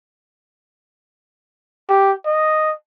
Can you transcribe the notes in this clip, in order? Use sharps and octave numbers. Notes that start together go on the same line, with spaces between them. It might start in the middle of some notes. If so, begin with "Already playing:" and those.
G4
D#5